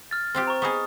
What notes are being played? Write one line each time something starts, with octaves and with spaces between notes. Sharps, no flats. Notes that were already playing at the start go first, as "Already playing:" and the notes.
F6 A6
C4 F4 G4
A#5 C#6
B3 D#4 G#4 C#6 D#6